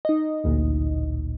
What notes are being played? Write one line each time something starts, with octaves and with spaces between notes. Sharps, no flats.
D#4 D#5
A1 D2 A#2